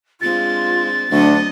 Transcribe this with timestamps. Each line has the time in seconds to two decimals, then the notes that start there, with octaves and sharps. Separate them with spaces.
0.21 G#3 C4 D4 F4 A6
1.11 D2 F#3 C4 D4 D#5